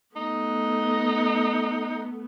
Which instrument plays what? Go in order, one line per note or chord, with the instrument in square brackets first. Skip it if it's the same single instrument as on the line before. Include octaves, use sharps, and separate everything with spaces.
[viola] A3 B3 [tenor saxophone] D#4